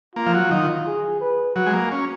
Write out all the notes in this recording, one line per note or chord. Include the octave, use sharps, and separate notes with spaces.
A#3 F4
F3
F#3
D#3 F4
G#4
B4
F#3 F#4
G#3
A#3
C#4